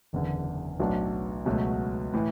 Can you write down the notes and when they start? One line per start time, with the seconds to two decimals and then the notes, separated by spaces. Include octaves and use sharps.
0.13 F#1 E2 D3
0.80 B1 A2 F#3 B3 D4
1.46 C#2 B2 F#3 A3
2.14 A2 E3